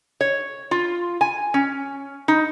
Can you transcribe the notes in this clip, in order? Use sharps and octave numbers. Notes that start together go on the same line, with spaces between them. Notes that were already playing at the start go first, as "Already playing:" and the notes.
C#5
F4
G#5
C#4
D#4